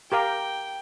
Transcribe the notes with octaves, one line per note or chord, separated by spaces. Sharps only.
G4 A#4 F5 G5